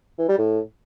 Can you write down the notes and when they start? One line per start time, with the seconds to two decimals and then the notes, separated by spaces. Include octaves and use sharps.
0.18 E3
0.28 G3
0.38 A2